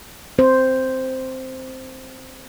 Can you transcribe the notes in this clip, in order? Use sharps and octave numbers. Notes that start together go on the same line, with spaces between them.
C4 C5